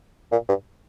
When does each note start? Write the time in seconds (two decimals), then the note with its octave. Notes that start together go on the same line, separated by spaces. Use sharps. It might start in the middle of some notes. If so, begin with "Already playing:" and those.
0.32 A#2
0.49 G2